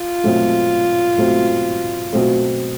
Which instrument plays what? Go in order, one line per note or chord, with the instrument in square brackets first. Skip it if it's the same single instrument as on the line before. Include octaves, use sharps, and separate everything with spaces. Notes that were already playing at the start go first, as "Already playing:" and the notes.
Already playing: [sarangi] F4
[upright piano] B2 F#3 A3 C4
B2 F#3 A3 C4
B2 F#3 A3 C4